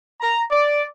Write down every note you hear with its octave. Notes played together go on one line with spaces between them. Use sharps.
A#5
D5